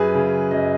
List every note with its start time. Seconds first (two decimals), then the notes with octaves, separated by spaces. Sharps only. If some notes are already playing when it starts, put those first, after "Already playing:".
Already playing: F#2 G#4 B4
0.14 C#3
0.51 F#2 D#5